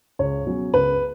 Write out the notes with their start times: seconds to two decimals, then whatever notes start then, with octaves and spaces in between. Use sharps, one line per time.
0.19 C#2 C#5
0.46 B2 F#3 C#4
0.74 C#2 B4